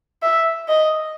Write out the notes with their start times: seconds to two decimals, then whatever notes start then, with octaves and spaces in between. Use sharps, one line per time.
0.23 E5
0.68 D#5